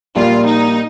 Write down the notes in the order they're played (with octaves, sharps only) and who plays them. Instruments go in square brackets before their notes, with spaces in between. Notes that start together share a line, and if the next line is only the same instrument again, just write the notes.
[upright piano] A#1 A#2 G3 A#3 [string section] F4
[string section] D#4